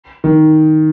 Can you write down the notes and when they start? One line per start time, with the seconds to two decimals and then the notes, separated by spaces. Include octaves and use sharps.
0.24 D#3